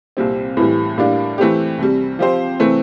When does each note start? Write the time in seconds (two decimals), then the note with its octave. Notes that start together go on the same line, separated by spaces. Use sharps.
0.17 C2 A#2 G3 C4
0.57 A2 E3 G3
0.98 A2 G3 A#3 D4
1.38 E3 A3 C4 G4
1.78 C2 C3 G3
2.19 F3 C4 G4 C5
2.60 C3 E3 A3 C4